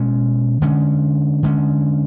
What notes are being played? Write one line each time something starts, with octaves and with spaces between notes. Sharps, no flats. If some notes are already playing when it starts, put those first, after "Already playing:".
Already playing: B2 G#3 C#4
D3 G#3 C#4
D3 G#3 C#4